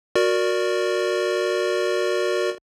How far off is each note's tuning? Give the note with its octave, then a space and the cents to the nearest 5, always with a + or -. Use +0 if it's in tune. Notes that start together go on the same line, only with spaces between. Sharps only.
F#4 -15 A#4 +0 D5 +0